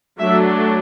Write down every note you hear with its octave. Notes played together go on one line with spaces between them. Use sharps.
F#3 A3 D4 E5